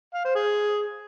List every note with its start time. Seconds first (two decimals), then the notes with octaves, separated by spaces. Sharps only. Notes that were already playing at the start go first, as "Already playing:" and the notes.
0.14 F5
0.25 C5
0.35 G#4